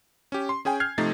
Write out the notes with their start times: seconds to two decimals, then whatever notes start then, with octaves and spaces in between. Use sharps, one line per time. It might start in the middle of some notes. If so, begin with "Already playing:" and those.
0.32 C#4 G4
0.49 C6
0.65 C#4 G#4 G5 G#5
0.80 F6 G6 G#6 C7
0.98 C3 F3 A3 D#4 A6